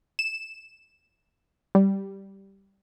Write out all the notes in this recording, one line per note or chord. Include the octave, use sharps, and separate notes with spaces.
E7
G3